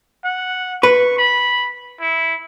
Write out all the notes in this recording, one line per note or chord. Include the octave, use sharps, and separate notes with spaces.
F#5
B4 C#6
B5
E4